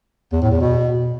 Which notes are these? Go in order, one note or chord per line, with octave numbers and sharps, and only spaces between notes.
E2
A2
E2
B2